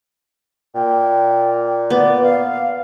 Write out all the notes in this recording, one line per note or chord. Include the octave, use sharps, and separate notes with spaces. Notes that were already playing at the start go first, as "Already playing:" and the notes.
A#2 G5
B3 D5
F5